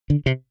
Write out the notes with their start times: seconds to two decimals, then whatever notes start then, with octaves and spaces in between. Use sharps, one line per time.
0.10 D3
0.26 C3